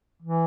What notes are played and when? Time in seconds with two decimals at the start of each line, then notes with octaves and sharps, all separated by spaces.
0.23 E3